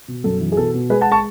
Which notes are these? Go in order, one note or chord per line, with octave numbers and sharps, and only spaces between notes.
B2
F#2 A4
E3
G#4
B2 A4
B2
G#3 G#4 B4
F#5 A5
A5 C#6